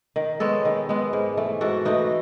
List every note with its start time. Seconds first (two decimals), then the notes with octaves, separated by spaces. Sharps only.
0.16 D#3
0.40 G#3 B3 A4 C#5
0.65 D#3
0.89 G#3 B3
1.13 G#2
1.37 E3 A3
1.61 G#2 F#4 A4
1.85 E3 A3 D#4 F#4